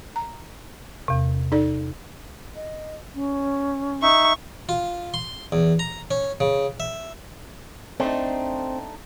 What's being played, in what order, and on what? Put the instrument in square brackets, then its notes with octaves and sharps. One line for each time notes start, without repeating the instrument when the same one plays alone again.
[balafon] A#5
[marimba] E2 C3
[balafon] D#4 A4 D5
[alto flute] D#5
C#4
[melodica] D#4 E5 [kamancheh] C#6
[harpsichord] F4
C6
E2
A#5
C#4
C#3
E5
[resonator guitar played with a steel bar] A3 D4 D#4 [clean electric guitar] C4